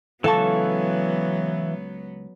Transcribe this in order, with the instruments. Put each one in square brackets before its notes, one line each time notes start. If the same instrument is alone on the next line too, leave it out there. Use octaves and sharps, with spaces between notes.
[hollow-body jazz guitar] C#2 A5 [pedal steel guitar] E3 F5 C#6 [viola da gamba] F#3 B3 [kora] A4